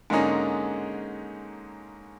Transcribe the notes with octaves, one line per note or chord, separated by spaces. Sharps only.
G#2 D3 G#3 A#3 C#4 D#4